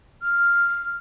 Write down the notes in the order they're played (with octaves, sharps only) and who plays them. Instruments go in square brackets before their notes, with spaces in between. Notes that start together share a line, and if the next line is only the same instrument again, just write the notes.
[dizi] F6